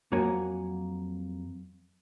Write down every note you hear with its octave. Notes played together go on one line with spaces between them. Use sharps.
F2 F#3 A#3 F#5 G#5